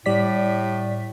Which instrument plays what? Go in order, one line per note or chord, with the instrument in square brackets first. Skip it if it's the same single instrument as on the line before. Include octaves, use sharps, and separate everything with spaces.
[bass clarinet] A2 [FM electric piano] G3 D5 B6